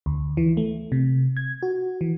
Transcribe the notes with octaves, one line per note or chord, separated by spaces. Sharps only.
D2
E3
A3
C3
G#6
F#4
E3